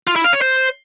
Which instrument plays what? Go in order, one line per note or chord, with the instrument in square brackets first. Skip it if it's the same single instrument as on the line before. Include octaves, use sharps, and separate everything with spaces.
[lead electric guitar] F4
E4
F5
C#5
C5